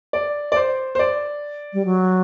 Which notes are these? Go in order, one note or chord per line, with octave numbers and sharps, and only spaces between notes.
D5
D5
C5
C5
D5
G3
F#3